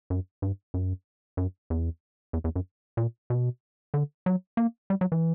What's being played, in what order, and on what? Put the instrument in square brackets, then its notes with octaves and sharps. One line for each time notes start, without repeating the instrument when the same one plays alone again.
[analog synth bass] F#2
G2
F#2
F#2
E2
E2
E2
F#2
A#2
B2
D3
F#3
A#3
G3
F#3
E3